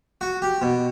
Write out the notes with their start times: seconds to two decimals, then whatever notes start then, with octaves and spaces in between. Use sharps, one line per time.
0.21 F#4
0.42 G4
0.62 B2